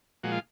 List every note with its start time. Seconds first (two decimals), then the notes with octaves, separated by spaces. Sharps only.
0.23 A#2 F3 G#3 F#4
0.32 F4